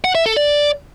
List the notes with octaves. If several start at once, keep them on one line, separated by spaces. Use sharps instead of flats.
F#5
E5
A4
D5